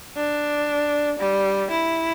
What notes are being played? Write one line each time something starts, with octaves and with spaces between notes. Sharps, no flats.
D4
G3
E4